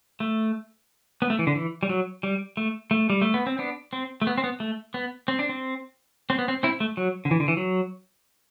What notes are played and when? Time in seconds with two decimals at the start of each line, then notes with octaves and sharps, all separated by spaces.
0.20 A3
1.22 B3
1.30 A3
1.39 E3
1.47 D3
1.55 E3
1.83 G3
1.89 F#3
2.23 G3
2.57 A3
2.91 A3
3.10 G3
3.22 A3
3.34 B3
3.47 C4
3.59 B3 D4
3.93 C4
4.22 A3
4.27 B3
4.38 C4
4.44 B3
4.60 A3
4.94 B3
5.28 C4
5.39 D4
5.49 C4
6.30 C4
6.39 B3
6.48 C4
6.63 C4 E4
6.80 A3
6.97 F#3
7.25 D3
7.31 E3
7.40 D3
7.48 E3
7.57 F#3